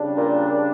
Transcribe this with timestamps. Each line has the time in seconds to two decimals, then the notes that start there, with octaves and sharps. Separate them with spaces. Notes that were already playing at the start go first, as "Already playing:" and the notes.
Already playing: C#3 G3 D4
0.17 A#2